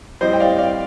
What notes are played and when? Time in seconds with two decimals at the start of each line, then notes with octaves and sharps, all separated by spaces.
0.21 A2 G3 C4 C5 D#5
0.33 G5
0.40 D5 F5
0.59 D5 F5